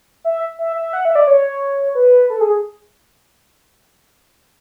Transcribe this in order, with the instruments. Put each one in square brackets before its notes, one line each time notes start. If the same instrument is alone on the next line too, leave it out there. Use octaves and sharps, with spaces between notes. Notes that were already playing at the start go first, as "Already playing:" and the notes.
[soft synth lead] E5
E5
E5
F#5
E5
D5
C#5
B4
A4
G#4